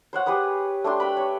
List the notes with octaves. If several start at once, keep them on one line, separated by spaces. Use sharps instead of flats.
C5 C#5 F#5
G4 G#4 B4 D#6
A3 D4 G4 C6
B4 G5 B5
C#5